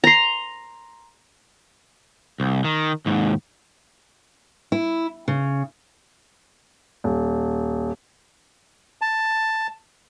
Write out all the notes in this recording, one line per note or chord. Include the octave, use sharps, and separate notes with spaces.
A#5 C6
C2
D#3
D#2 G#2
E4
C#3
D#1
A5